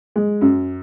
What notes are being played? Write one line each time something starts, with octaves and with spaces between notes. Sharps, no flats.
G#3
F#2